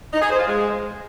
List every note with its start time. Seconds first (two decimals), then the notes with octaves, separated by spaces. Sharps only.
0.13 D#4
0.22 G#4
0.30 C5
0.39 F4
0.48 G#3